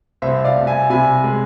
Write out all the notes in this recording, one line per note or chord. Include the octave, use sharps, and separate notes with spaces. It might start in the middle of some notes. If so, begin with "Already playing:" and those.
C2 C5 E5
D5 F5
C2
E5 G#5
C3 G#5 B5
G#3